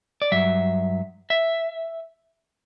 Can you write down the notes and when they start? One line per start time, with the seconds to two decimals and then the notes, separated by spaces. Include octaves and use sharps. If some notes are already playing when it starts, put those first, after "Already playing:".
0.22 D5
0.32 G2 F#3 E5
1.30 E5